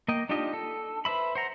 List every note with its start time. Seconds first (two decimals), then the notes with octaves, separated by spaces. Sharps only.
0.08 A#3 D#5 G5
0.29 D4 D#4 F4 G4 D#5
0.53 A4
1.05 B4 C5 E5 B5
1.35 C5 F#5 A#5